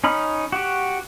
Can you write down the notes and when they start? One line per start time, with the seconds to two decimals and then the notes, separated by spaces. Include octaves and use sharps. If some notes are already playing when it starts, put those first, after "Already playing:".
0.04 C#4 D#4 B5 F6
0.52 F#4 G4